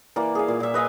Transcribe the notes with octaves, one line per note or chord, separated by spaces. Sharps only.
E3 A#3 D5
G#4 F5
A#2
A#2 E5
B4 D#5 F5 G#5